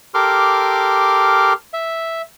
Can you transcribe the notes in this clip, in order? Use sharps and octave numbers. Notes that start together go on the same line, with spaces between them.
G4 A4 A#4 C6 D6 F6
E5